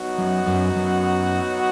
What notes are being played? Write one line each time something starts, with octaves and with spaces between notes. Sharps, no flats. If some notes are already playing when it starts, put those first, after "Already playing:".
Already playing: F#3 B3 D#4 F#4
F#2
F#2
F#2